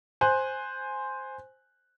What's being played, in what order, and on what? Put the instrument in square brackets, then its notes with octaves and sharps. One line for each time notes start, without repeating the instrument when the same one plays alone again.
[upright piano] C5 G#5 F#6